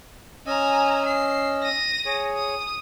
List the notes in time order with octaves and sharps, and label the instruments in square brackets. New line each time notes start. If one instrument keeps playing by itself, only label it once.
[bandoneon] C#4 D#5 E6 [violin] G#5 A#5
[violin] C7
A#6 D#7
[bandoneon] G#4 C#5
[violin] D#6